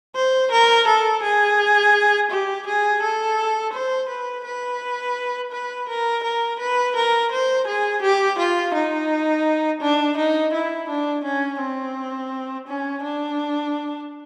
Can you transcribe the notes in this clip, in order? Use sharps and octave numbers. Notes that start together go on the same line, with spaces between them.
C5
A#4
A4
G#4
G4
G#4
A4
C5
B4
B4
B4
A#4
A#4
B4
A#4
C5
G#4
G4
F4
D#4
D4
D#4
E4
D4
C#4
C4
C#4
D4